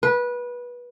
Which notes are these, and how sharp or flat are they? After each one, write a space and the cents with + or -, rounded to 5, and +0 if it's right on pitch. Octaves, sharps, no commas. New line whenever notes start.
B4 -20